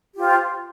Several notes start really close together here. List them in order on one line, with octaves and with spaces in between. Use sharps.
G4 F4 C5